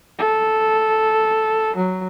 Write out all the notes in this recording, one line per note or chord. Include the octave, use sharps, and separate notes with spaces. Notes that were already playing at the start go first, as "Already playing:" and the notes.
A4
F#3